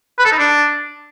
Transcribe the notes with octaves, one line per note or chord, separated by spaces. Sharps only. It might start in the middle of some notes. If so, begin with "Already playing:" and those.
B4
A4
D#4
D4